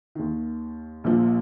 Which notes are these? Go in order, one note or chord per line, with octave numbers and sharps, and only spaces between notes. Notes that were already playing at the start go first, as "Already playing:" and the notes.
D#2 D#3
A#1 A#2 F3